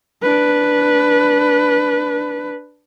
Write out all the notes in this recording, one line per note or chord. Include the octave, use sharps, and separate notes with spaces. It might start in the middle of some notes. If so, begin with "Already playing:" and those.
D4 B4